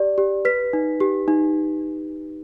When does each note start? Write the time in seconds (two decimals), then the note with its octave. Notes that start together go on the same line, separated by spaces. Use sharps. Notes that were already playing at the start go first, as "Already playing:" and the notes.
Already playing: G4 D5
0.18 G4
0.45 B4 B6
0.73 D#4
1.00 G4
1.28 D#4